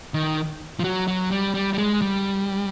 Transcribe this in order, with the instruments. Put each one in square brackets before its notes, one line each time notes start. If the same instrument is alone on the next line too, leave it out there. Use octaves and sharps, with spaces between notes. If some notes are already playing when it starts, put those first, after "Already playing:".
[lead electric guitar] D#3
F3
F#3
F#3
G3
G3
G3
G#3
G3